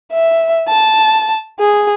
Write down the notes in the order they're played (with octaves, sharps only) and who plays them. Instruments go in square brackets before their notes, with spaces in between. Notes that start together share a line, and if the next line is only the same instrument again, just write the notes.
[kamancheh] E5
A5
G#4